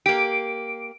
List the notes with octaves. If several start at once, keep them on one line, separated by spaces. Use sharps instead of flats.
A#3 G4 D7